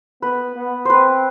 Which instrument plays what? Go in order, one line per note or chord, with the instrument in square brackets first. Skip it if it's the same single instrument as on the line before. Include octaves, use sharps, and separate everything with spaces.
[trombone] B3 [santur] B4
[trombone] B3
[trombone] C4 [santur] B4 C5